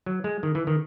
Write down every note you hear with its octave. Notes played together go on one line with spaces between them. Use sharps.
F#3
G#3
D#3
E3
D#3